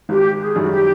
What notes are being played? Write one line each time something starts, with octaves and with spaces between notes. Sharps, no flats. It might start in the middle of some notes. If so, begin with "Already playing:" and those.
G#1 G4
G#4
F#2 D#3 G3 F#4
G4